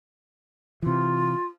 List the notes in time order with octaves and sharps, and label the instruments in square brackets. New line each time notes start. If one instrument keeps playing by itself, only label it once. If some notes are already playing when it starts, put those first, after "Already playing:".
[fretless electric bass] C3 E3 [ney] F4